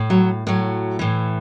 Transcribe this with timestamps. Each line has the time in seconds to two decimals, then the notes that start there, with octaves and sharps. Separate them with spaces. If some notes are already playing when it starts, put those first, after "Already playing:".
Already playing: A2
0.10 F#3
0.47 A2 F#3
0.99 A2 E3